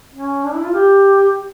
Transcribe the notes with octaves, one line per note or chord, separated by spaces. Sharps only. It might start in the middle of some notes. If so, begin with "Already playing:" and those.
C#4
D4
E4
F4
G4